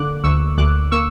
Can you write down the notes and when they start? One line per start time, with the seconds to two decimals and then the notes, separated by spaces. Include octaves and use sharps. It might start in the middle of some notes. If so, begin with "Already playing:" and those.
Already playing: D3 A#3 D6 F#6
0.24 D2 C#6 E6
0.58 D2 D6 F#6
0.91 A#3 C#6 E6